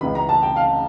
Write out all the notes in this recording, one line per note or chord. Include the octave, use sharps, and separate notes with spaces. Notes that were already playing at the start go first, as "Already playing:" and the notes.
C#2 C#3 E3 B5
A#5
A5
G5
F5